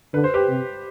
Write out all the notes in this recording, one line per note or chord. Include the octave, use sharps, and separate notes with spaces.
D3 B4
C5
G4 B4
C3